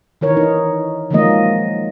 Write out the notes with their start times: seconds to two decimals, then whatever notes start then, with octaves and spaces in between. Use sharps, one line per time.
0.21 D#3 E3 A#4 C#5
0.37 D#4
1.11 D#3 F3 F#3 G#3 A#3 D#5